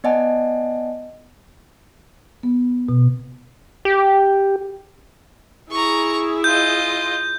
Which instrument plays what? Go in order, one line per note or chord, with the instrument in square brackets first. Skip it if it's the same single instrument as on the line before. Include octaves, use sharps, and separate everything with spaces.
[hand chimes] B3 D5 D#5 F#5 G#5 A5
[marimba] B3
B2
[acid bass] G4
[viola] E4 G#4 [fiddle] A#5 C#6
[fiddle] F4 D#5 [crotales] G6